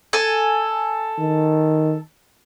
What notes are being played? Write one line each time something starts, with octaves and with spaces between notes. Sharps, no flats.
A4 G#5
D#3